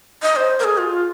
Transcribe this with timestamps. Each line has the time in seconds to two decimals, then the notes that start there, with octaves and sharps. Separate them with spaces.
0.22 D#5
0.36 C5
0.60 A#4
0.64 G#4
0.78 F4